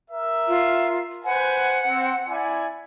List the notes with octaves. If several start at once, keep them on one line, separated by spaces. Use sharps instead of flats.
A#4 E5
F4
B4 C5 F#5 G#5
C4
E4 D5 G#5